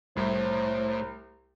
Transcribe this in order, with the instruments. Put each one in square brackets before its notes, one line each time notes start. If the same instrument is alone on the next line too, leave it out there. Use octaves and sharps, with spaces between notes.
[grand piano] C2 [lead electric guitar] A2 [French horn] C5